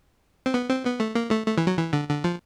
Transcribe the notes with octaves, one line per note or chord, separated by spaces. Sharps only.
C4
B3
C4
B3
A3
A#3
A3
A3
E3
F#3
E3
D3
D3
F3